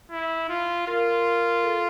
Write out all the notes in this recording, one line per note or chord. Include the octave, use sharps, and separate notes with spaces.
E4
F4
F4 A#4
A4